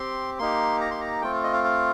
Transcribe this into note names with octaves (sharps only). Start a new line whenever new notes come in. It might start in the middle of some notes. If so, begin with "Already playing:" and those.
Already playing: C4 G4 C6
A#3 D#4 G4 C6
A#5
C6
A#5
A3 C4 F4 G5
F5
D#5
F5
F5